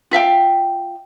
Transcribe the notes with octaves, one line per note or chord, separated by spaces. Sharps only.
F4 E5 F5 G5